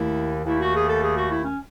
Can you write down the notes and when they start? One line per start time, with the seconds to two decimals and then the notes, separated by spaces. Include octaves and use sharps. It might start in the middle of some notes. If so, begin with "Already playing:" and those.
Already playing: D#2 D#3 A3 E4
0.45 D#2 D#3 A3 E4
0.59 F#4
0.73 G#4
0.87 A4
1.01 G#4
1.15 F#4
1.30 E4
1.44 C#4